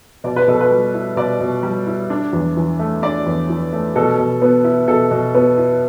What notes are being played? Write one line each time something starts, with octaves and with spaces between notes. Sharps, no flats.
B2 D5
B4
B2 A4
B4
G3
E4
B2 D5
B2
G3
E4
D4
E2
E3
A3
D4 D5
E2
E3
A3
B2 A4
B2
B3
E4
B2 A4
B2
B3
E4